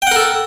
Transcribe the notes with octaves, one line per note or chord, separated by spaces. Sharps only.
A4 A#4 F#5 G5